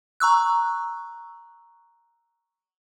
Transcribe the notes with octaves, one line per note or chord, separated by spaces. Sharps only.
A#5 C#6 E6 F#6